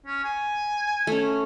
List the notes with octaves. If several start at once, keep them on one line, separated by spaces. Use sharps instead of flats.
C#4
G#5
A3 C#4